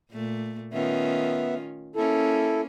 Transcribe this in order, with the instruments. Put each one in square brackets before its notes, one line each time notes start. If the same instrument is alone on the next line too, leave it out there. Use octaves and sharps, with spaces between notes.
[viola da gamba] A#2 A3
[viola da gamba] D#3 C#4 F4 [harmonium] B3 E5
[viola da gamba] A#3 C#4 [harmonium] E4 A4